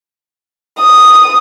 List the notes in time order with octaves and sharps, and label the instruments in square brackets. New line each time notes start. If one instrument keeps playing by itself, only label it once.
[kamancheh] D#6